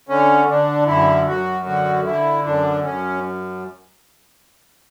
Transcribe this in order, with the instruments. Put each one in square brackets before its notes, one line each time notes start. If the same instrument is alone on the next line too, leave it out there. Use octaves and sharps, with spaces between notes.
[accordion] D3 C#4
D3 D4
F#2 E4
F#2 F#4
D3 F#4
D3 E4
F#2 D4
F#2 C#4